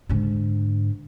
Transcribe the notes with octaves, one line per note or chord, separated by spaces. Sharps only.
G#2 D3